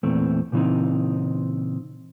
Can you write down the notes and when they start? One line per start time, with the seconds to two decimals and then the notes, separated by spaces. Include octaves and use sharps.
0.03 E2 A#2 A3 C4
0.52 A#2 C#3 E3 B3 C4 D#4